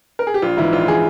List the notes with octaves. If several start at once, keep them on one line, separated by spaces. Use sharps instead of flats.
A#4
G#4
G4
A#1 F4
G#2 E3 E4
A#1 F4
E3 G#4